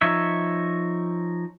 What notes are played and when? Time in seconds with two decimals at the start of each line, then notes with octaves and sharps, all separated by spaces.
0.01 F3 D#4 C#5 E5